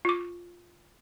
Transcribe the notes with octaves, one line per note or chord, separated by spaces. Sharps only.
F4 D6